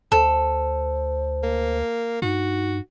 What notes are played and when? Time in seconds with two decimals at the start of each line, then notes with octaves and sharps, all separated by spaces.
0.12 D2 A4 C5
1.43 A#3
2.22 G2 D#4 F#4